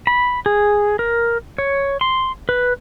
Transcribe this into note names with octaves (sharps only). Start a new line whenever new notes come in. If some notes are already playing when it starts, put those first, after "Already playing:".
B5
G#4
A#4
C#5
C6
B4